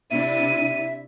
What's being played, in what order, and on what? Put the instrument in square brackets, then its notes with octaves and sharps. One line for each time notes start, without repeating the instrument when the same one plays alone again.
[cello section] C3 D4 E4 [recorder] E5 [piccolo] D#7